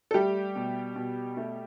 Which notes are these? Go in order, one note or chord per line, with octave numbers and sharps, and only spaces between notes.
A4
G3 A3 G4
B2
B2
A3